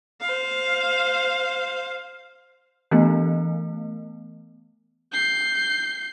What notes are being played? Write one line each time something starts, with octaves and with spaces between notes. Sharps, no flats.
C5 F5
E3 A3 B3
G6 C7